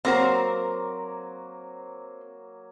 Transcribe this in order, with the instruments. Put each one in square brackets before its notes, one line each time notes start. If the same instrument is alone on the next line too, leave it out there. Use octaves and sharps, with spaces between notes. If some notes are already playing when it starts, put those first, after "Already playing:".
[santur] F#3 A#3 [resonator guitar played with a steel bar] C4 A#4 C5